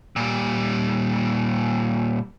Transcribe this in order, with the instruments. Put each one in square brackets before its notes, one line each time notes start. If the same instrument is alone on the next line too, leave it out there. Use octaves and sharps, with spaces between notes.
[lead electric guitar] A#2 G3